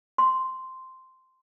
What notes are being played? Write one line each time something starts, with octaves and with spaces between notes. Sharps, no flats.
C6